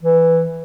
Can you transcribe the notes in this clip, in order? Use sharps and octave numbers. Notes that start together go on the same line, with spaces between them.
E3